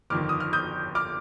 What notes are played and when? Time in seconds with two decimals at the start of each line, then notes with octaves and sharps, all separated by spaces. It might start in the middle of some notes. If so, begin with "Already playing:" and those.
0.10 G1 F2 D#3 D6 F6
0.29 D#6
0.40 F6
0.53 D#6 G6
0.95 D6 F6